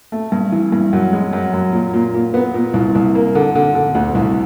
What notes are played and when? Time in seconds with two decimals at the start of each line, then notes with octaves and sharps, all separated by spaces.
0.12 A3
0.32 G2
0.52 E3
0.72 G2
0.93 F#2
1.13 G#3
1.33 F#2
1.54 F#2
1.73 A#2
1.94 A#2
2.14 A#2
2.34 B3
2.54 A#2
2.74 C2
2.95 C2
3.15 A#3
3.35 D3
3.55 D3
3.75 D3
3.95 D2
4.15 C2